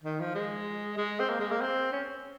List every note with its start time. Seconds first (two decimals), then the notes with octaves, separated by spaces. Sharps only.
0.04 D#3
0.20 F3
0.35 G#3
0.98 G#3
1.20 C4
1.30 A#3
1.40 G#3
1.51 A#3
1.62 C4
1.92 C#4